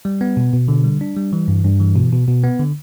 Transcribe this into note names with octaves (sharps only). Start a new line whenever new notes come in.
G3
B3
B2
B2
D3
G3
D4
G3
E3
G2
G2
E3
B2
B2
B2
B3
D3